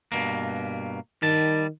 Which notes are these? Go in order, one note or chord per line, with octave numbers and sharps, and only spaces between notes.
G2 B2 A#3
D#3 G3 A5